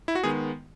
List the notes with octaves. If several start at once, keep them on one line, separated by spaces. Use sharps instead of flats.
E4
F#4
D#3 G#3 B3 G#4